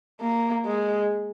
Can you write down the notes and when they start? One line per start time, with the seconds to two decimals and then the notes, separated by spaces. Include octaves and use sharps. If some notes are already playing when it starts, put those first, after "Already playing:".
0.21 A#3
0.66 G#3